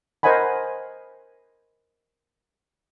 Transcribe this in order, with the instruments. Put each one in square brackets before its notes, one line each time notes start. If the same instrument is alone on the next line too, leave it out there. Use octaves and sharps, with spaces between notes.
[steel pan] A#4 C5 D#5 F#5 G#5 B5